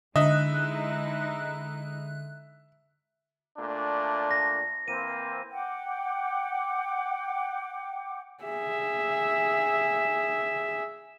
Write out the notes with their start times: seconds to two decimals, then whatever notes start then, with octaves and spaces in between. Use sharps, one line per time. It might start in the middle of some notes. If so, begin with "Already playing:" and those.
0.16 D3 G#3 D#4 E4 D#5 E5 F#6
3.58 A#2 A3 D4
4.31 A#6
4.88 E3 A#3 C4 D#7
5.51 F#5 G5 D6
8.44 G#4 E5